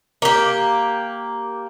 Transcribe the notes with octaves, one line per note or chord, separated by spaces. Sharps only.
A#3 G4